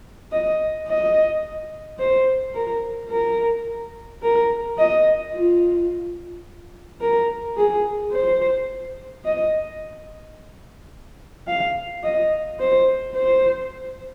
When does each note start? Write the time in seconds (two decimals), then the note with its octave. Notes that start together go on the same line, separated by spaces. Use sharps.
0.32 D#5
0.88 D#5
1.99 C5
2.55 A#4
3.10 A#4
4.23 A#4
4.78 D#5
5.34 F4
7.01 A#4
7.57 G#4
8.12 C5
9.25 D#5
11.47 F5
12.03 D#5
12.59 C5
13.15 C5